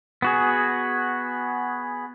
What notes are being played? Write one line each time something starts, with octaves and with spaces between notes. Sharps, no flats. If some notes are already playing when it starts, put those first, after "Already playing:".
B3 F#4 G#4